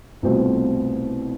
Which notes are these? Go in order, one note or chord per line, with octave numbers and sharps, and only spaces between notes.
C2 B2 A3 C4 F4